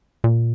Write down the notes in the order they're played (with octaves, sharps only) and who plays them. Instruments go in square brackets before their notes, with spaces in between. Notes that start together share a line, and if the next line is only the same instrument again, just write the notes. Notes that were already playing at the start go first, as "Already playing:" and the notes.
[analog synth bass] A#2